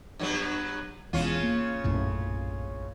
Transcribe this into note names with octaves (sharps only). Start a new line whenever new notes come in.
G2 F#3 B3
E1 E2 C#3 C#4 F4
A#3
A#1 F#2 A2